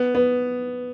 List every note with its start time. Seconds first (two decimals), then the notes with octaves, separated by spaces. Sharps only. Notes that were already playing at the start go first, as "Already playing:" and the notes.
Already playing: B3
0.15 B3